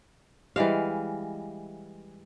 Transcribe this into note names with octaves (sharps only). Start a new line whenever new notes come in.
E3 G3 G#3 F5